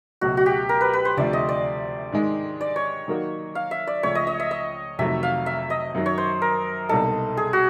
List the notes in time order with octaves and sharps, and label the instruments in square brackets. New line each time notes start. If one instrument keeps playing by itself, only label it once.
[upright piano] C#2 B2 F#3 A3 [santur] F#4
[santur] F#4
G4
A#4
B4
B4
C5
[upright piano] D2 C3 F3 A3 [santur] D5
[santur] D#5
D5
[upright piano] G#2 D#3 G#3
[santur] D5
C#5
[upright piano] D#3 F#3 A#3 D#4 F#4
[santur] F5
E5
D5
[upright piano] C#2 C#3 F3 A3 [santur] C#5
[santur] D#5
D#5
E5
D#5
[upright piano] F2 C3 D#3 F#3 A3 [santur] E5
[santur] F5
E5
D#5
[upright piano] F#2 D#3 F#3
[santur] C#5
C5
A#4
[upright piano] C2 B2 G3 A#3 D#4 [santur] A4
[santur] G#4
F#4